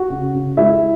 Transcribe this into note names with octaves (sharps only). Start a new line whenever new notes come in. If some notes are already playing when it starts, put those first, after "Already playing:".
Already playing: F#4
C#3
C#3
G#3 E4 E5